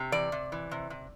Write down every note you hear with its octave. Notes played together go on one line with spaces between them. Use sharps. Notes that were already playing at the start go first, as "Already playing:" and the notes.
Already playing: C3
E3 D5
C3
E3
C3
C3